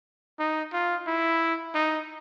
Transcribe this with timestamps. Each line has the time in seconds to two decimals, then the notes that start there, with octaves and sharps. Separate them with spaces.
0.39 D#4
0.73 F4
1.07 E4
1.75 D#4